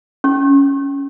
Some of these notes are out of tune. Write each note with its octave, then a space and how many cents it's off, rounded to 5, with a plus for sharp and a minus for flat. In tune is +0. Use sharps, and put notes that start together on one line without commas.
C#4 +5 C#6 -45